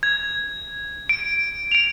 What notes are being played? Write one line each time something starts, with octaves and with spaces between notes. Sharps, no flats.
G#6
D7
D7 F7